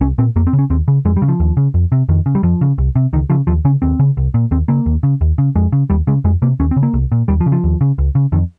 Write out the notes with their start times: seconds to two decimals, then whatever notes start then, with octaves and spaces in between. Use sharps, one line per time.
0.01 C2 C#4
0.18 A#2 C4
0.36 F2 A#3
0.47 C4
0.53 C#3
0.59 C#4
0.70 D#2 C4
0.88 C#3
1.05 F2 G#3
1.17 G3
1.22 C#3
1.28 F3
1.40 D#2
1.57 C#3
1.74 F2
1.92 C3
2.09 F2 D#3
2.26 C#3
2.35 G3
2.43 F2 F3
2.61 C#3
2.78 C2
2.96 C3
3.13 C#2 D#3
3.30 C#3 F3
3.47 D#2 F3
3.65 C#3 C#4
3.82 D#2 C4
3.99 C#3
4.17 C2
4.34 A#2
4.51 D#2 C4
4.68 C#3 A#3
4.86 D#2
5.03 C#3
5.21 D#2
5.38 C#3
5.56 F2 G#3
5.72 C#3
5.90 D#2 G3
6.07 C#3 G#3
6.24 F2 G#3
6.42 C3 A#3
6.60 D#2 C#4
6.71 C4
6.76 C#3
6.83 A#3
6.94 C2
7.12 A#2
7.28 D#2 G3
7.40 F3
7.46 C#3
7.52 F3
7.64 D#2
7.81 C#3
7.98 C#2
8.15 C#3
8.32 F2 D#3